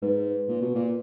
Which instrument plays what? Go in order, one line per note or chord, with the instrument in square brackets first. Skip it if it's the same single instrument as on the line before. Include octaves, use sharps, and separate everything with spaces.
[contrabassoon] G#2 [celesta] B4
[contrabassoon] A#2
B2
A#2